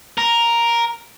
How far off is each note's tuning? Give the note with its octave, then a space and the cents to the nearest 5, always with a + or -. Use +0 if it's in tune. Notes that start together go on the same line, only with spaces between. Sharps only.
A#4 +5